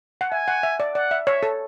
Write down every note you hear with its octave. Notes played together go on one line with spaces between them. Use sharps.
F#5
E5 G#5
F#5
E5
D5
D5 F#5
E5
C#5 E5
A4